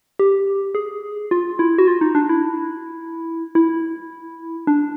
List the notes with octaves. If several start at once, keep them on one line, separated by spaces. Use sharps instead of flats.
G4
G#4
F4
E4
F#4
F4
D#4
D4
E4
E4
D4